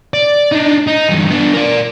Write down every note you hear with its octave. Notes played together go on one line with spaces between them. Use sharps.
D5
D4 D#4
D#4
E2 G2
B3 D4
A#4 D5